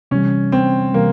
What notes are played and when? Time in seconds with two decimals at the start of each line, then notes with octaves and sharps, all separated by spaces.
0.11 C3 E3 G3 C#4
0.52 C4
0.93 C3 E3 G3 A#3